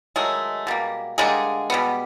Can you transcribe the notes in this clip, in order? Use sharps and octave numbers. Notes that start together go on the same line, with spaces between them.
D#3 F#3 G#3 A3 G#4
B2 G3 A#3
D3 G3 G#3 A#3 G#4
B2 G3 B3